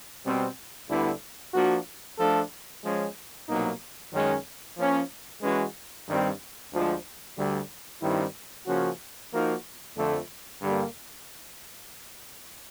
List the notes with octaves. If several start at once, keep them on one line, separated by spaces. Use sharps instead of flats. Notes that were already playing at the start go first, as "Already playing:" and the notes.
B2 G3 C4
D2 D3 G3 B3 E4
F3 A#3 D4 F#4
F3 A3 D4 F4 A4
F3 G#3 C#4
C2 B2 F#3 A#3 D#4
F#2 D#3 G#3 C#4
F3 A#3 C#4
E3 G#3 C#4 F#4 B4
G2 D#3 G3 C4
D2 D3 F3 G#3
D2 D3 G3
G2 D#3 G3 C4 E4
C#3 F3 A#3 C#4 F#4
F3 A#3 D#4 F#4 A#4
F2 D3 F3 A3
G2 D3 G3 A#3